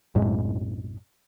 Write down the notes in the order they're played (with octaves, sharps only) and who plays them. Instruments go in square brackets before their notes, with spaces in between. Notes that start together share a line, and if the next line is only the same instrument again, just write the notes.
[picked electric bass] B1 F#2 A2 G#3